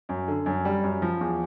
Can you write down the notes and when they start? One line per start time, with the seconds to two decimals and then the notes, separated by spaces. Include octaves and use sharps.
0.09 F#2
0.28 D3
0.46 F#2
0.65 G3
0.83 F#2
1.02 F3
1.21 E2